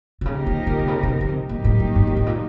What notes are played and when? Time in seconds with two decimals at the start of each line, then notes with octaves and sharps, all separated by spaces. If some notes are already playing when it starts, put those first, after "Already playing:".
0.21 C3
0.26 C#3 F3 A#3 D#4 G4 A#4
0.47 D#3
0.67 D#3
0.79 C3
0.88 C#3
1.03 C3
1.08 B2
1.21 C#3
1.28 C3
1.49 A#2 D#3 F#3 A#3 D#4 G4
1.64 A2
1.80 A2
1.95 G2
2.07 G#2
2.17 A2
2.27 A#2